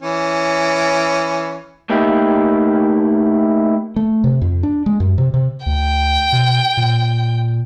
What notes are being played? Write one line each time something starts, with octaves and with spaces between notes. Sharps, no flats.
E3 C#4
A3 A#3 D#4 E4 G4
A3
C3
F2
D4
G#3
F#2
C3
C3
D2 G5
B2
A#2